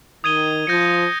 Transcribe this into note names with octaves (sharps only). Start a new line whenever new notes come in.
D#3 D#6 G#6 D#7 G7
F3 G6 A#6 C#7